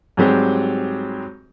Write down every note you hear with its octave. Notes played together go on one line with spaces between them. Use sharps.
G#2 F#3 G3 C4 G4 G#4